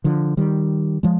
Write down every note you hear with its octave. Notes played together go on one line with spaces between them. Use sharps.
D3 F3
D#3 G3
F3 G#3